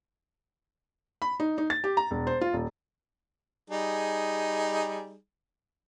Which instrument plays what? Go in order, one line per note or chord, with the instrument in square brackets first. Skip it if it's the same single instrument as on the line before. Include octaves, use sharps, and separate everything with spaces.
[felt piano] B5
D#4
D#4
A6
G4
A#5
E1
C5
F4
D#1
[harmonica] G3 D#4 G#4